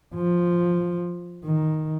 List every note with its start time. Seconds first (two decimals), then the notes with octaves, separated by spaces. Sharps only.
0.15 F3
1.45 D#3